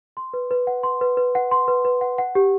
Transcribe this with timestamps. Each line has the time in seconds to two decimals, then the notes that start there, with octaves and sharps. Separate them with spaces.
0.17 C6
0.34 B4
0.51 B4
0.67 F#5
0.83 C6
1.01 B4
1.17 B4
1.35 F#5
1.51 C6
1.68 B4
1.85 B4
2.01 F#5
2.18 F#5
2.35 G4